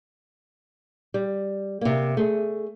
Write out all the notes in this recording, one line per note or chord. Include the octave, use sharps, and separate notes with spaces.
G3
C3 A#3
A3 G#4